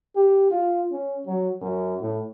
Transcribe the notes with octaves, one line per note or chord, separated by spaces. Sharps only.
G4
F4
C#4
F#3
F#2
A2